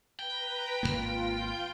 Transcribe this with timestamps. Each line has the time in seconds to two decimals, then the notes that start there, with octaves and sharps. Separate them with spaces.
0.19 B4 G5 A#5
0.83 G#1 F#2 A#3 F4